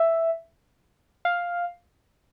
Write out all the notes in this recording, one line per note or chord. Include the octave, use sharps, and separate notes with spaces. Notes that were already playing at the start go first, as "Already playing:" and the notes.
Already playing: E5
F5